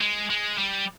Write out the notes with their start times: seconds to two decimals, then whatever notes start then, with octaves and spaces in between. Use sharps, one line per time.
0.01 G#3
0.30 G#3
0.58 G3